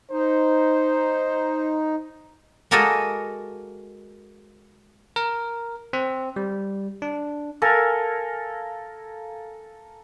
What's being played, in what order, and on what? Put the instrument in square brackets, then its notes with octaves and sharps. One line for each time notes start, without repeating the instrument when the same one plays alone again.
[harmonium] D#4 [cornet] C5
[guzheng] G#3 A#3 F#4 A4 A#4 D#5
[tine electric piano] A#4
C4
G3
D4
[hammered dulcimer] A4 A#4 F5 G#5